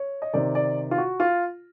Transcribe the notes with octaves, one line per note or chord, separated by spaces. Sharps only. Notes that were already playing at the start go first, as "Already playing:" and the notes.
Already playing: C#5
D#5
C3 D#3 D5
D5
F4
F#4
F4